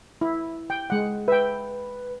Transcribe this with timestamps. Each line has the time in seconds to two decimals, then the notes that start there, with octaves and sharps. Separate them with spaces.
0.21 E4
0.70 G5
0.90 G#3 F#5
1.28 B4 E5 G5